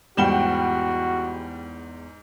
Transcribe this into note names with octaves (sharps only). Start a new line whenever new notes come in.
E2 G#2 G3 F#4 F#5 G5 E7 G7